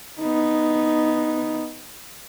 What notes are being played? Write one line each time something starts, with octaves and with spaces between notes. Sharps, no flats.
B3 D#4